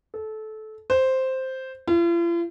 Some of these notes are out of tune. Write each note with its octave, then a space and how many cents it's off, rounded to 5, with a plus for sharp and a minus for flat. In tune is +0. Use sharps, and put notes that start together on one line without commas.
A4 -20
C5 +0
F4 -45